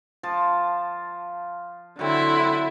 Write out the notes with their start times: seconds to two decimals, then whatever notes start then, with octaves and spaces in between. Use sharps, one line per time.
0.23 F3 A5
1.99 D3 F#3 C4 E4